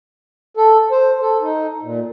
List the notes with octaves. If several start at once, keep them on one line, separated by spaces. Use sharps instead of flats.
A4
C5
A4
D#4
A#2